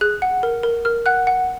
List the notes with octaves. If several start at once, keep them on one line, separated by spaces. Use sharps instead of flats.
G#4 F#6
F#5
A#4
A#4
A#4 F6
F#5 F#6
F#5